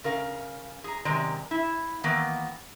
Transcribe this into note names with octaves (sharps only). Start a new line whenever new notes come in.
C#3 A#4 F5
G#4 A#5
F#2 C3 D#3 G#3 D5 A#5
E4
D#3 E3 A#3 B3